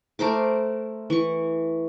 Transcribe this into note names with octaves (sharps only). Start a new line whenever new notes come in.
A3 A#4 C5 D6
E3 C#6